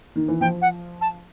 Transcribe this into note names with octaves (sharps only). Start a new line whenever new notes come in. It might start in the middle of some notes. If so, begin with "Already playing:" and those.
D#3
E3
F3 G5
F#5
A5